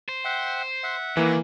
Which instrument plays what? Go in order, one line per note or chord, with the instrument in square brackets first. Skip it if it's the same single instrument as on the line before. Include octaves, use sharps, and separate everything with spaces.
[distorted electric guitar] C5
[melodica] E5 F#5 G5
E5 F#5
[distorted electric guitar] D#3 [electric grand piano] E3 A#3